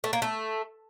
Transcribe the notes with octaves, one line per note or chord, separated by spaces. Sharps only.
A3
A#3
A3